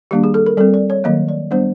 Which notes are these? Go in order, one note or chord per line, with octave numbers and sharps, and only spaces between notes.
D#3 G3 A#3 D4 G4
G#4
A4
A#4
G3 C4 A4
D5
C#5
D#3 F#3 A#3 D#5
D5
G3 B3 D4 C5